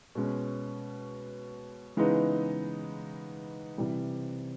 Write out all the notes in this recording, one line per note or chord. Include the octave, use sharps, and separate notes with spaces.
B2 G#3 C#4
C#3 E3 G#3 B3 D#4
C3 E3 G3